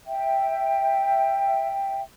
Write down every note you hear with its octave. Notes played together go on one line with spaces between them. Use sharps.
E5 G5